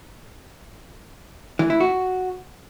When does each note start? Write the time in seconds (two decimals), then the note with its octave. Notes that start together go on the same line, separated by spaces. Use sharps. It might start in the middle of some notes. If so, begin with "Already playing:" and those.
1.59 E3
1.70 E4
1.80 F#4